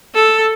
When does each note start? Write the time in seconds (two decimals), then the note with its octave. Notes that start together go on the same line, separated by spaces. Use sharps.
0.15 A4